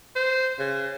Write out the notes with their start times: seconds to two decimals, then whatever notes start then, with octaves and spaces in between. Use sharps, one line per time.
0.16 C5
0.59 C#3